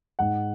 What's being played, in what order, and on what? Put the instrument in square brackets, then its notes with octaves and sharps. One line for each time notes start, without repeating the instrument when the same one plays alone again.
[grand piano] G#2 F#5